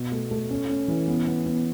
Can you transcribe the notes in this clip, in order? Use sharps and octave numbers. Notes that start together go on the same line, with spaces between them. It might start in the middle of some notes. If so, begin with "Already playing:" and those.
Already playing: B2
A3
A3
C#4
C#4
E3
B3
B3
B3